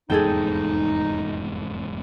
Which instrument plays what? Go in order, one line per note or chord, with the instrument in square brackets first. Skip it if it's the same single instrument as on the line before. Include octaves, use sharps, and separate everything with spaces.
[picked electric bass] F1 E2 G#2 [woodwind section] D#4 [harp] G#4 A4 G5